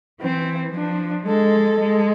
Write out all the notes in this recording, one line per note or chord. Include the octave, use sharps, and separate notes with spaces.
E3 C4
F3 D4
G#3 A4
G#3